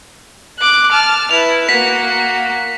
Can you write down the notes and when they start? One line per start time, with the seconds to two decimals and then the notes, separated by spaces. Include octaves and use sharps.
0.58 D6 F#6
0.91 A5 F6
1.31 E4 B4 F7
1.69 A#3 F#4 B6